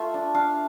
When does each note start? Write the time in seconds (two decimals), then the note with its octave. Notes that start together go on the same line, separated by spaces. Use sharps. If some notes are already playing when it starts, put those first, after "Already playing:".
Already playing: A3 F4 E5
0.14 D4
0.34 D4 F5